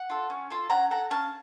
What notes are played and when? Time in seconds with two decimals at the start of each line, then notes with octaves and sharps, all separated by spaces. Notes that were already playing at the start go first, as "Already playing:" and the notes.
Already playing: F#5
0.10 F4 A4
0.30 C#4
0.50 F4 A4
0.70 C#4 F#5 A#5
0.91 A4 F#5 A#5
1.10 C#4 F5 A5